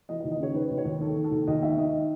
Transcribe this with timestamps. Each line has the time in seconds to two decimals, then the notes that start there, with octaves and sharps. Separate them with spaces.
0.09 E3 D#5
0.20 D#5
0.24 D#2
0.32 D#5
0.40 C#3 C#5
0.54 D#3 B4
0.70 D#2
0.78 C#5
0.85 D#2
1.00 D#3 A4
1.16 D#3
1.24 A4
1.32 D#2
1.47 D#2 D#5
1.62 D#3 E5
1.77 D#3 D#5